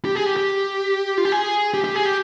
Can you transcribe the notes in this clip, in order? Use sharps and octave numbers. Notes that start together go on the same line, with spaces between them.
G4
G#4
G4
G4
F4
G4
G#4
G4
G4
G#4
G4